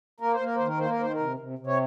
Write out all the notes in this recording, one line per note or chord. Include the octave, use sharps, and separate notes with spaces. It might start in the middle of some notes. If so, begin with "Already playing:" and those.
A#3 A#4
C5
A#3 A#4
D#3 C5
A#4
A#3 C5
A#4
D#3 C5
A#4
C3
C3
C3
C#5